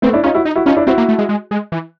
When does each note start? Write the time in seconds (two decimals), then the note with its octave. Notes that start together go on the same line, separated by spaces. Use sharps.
0.02 A3 B3 C4
0.13 D4 E4
0.23 C#4 D#4 F4
0.35 E4 F#4
0.45 D#4
0.56 E4 F#4
0.66 C#4 D#4 F4
0.77 D4 E4
0.87 C4 E4 F#4
0.98 A#3
1.09 A3
1.19 G#3
1.29 G#3
1.51 G#3
1.72 E3